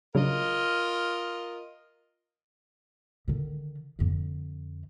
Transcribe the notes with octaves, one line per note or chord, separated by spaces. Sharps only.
C#3 F#3 D4 F4 A#4 D#5
D3 D#3
F2 D3